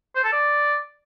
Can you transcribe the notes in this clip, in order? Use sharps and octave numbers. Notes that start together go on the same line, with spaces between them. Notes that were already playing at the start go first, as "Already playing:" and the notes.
C5
A4
D5